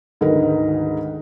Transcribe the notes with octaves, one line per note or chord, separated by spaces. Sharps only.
D2 G#2 D#3 D#4 A#4 B4